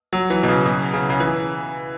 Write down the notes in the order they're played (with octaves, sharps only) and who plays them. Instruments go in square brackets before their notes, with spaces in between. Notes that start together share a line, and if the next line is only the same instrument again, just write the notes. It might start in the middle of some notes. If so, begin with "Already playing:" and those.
[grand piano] F#3
E3
B2
C#3
B2
C#3
C#3
E3